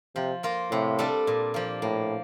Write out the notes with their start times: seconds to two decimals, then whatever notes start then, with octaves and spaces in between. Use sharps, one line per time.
0.16 C3 F3
0.43 A#3 F4 A#4
0.71 A2 C3
0.99 G3 D4 A4
1.27 A#2
1.54 F3 A#3
1.82 A2 A#3